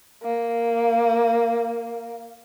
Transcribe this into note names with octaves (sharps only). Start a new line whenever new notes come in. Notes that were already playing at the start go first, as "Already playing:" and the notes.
A#3